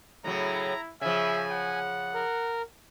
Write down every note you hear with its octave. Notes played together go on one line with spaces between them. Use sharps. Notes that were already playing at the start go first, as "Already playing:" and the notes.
A2 C#3 F#3 E4 A#5
C#3 F3 E5 G#5
F#5
A#4